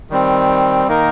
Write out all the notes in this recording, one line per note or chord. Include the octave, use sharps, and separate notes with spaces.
D#3 G3 C4
D#3 A#3 D#4 A#4